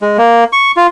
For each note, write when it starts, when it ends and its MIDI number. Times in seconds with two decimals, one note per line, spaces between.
0.02 0.17 56
0.18 0.44 58
0.53 0.72 85
0.77 0.87 65